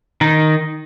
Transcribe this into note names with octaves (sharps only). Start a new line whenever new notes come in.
D#3 D#4